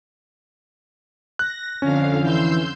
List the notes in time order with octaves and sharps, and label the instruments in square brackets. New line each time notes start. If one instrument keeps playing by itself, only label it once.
[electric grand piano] F#6 [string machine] A#6
[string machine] F2 D3 F5 [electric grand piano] C#4
[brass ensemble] E3 [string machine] C6 E6 G6